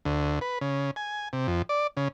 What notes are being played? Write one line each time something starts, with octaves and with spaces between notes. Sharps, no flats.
D2
B4
C#3
G#5
C3
F2
D5
C#3